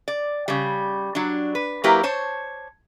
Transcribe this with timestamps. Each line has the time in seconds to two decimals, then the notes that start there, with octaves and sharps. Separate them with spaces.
0.08 D5
0.48 C#3 G3
1.15 F#3 D4
1.55 B4
1.84 F#3 A#3 E4 G4 A#4 B4
2.03 C5 C#5 A5